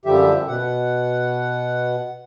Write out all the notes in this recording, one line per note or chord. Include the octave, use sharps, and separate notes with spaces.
F#2 D3 F3 G3 G4 E5
B2 F#5